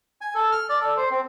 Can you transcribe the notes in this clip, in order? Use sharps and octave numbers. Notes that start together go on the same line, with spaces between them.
G#5
A4
F6
D5
A4
C5
C4